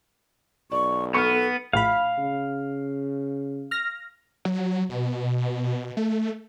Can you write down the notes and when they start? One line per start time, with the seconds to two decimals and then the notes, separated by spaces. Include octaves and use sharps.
0.72 B1 D5 C#6
1.14 B3 A4 C#6 F6
1.73 A#1 A2 F5 B5
2.18 C#3
3.71 F6 A#6
4.45 F#3
4.89 B2
5.97 A3